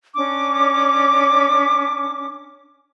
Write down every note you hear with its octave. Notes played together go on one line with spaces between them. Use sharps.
C#4 D4 D6